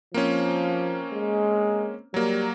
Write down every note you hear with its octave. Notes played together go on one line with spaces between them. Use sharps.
F3 A#3 C4 C#4
G#3
F#3 G3 A#3